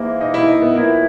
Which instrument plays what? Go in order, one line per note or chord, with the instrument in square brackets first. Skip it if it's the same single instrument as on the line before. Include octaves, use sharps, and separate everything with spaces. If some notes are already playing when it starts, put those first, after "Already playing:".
Already playing: [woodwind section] G#2 E3 A#3
[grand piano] D#4
E4
D#4
B3
[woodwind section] A#2 F#3 B3 E4 [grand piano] A#3